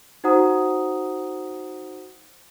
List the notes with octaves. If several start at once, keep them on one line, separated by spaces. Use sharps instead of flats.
D#4 F#4 C5 F#5 A#5 D#6